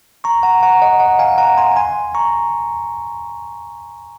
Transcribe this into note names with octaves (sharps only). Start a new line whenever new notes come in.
A#5 C#6
F#5 A#5
F#5 A#5
D#5 F#5
D#5 F#5
F5 G#5
F#5 A#5
G#5 C6
G#5 C6
A#5 C#6